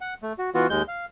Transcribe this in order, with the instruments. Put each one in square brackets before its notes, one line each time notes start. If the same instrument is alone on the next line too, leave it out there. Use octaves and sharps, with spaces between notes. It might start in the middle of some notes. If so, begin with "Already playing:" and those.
[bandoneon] F#5
A3
F#4
E3 B3 F4 F#4
D#2 G#3 G6
F5